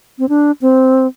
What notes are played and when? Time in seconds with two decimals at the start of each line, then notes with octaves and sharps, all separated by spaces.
0.19 C4
0.29 D4
0.62 C4